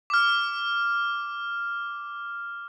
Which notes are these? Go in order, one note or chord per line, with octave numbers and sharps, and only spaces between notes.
D6 F6